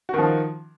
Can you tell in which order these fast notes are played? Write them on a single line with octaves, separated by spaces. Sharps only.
F#4 D#3 F3